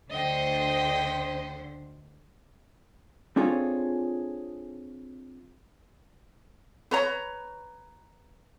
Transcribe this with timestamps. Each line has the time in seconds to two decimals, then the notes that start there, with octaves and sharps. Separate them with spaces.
0.10 D2 D3 C5 D#5 G5
3.36 C4 D4 F4 G#4 A4 C#5
6.91 B4 C#5 A#5